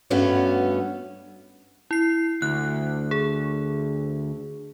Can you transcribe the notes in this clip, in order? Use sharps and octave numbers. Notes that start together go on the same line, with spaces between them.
G2 A3 B3 C#4 F#4
E4 C7
D2 F#6
G#4